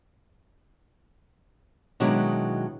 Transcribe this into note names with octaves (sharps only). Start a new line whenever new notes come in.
B2 D#3 F#3 G#3 D4 E4